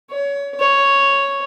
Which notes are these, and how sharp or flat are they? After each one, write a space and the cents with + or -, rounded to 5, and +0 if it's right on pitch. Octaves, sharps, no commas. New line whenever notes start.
C#5 +25
C#5 +0